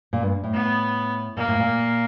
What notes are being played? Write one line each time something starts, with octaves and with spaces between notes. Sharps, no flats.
A#2
G2
A2
B3
A#2 A#3
A2
A#2